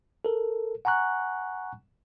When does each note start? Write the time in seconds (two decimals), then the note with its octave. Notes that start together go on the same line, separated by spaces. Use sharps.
0.25 A4 A#4
0.85 F#5 G#5 A#5 C#6 F#6